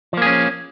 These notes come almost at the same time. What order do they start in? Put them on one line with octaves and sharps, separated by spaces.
F3 A#3 G#4 C#4